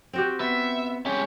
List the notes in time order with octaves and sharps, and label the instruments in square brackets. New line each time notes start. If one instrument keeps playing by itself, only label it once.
[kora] C4 F#4 G4
[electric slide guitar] B3 [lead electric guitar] E5
[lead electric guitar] G#3 G4 [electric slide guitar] C#4